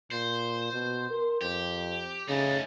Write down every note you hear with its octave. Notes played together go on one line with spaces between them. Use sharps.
A#2 C5
B2
A#4
F2 G4
C#3 A3 D#4